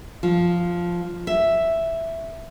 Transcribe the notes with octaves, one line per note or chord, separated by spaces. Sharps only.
F3
E5